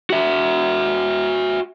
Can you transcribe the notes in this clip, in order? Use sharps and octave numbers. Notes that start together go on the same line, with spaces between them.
F#4 E5